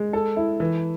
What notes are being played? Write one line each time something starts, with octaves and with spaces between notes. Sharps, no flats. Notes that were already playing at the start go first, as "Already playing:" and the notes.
Already playing: G#3
A4
E4
E3